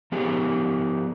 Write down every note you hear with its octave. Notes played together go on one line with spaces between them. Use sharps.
F3 B3 G4 G#4